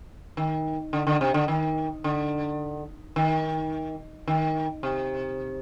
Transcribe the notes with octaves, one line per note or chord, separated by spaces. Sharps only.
D#3
D3
D3
C3
D3
D#3
D3
D#3
D#3
C3